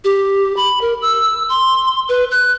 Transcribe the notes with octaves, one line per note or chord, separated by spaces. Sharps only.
G4
B5
A#4
E6
C6
B4
F#6